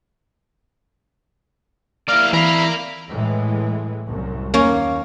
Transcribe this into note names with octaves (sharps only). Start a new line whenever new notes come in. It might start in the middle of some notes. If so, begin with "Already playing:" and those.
A#3 E4 D5 F6
E3 A#4 F5 B5
A2 E3 G#3
C2 F#2
D#2 A#3 C#4